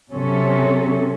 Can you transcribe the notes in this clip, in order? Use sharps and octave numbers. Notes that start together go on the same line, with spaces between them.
C3 F#3 C#4 A4